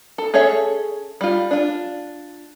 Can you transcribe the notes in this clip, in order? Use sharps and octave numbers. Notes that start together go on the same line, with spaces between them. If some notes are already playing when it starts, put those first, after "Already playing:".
A4
C#4 G#4 A4 C#5 E5
G3 F4
D4 F4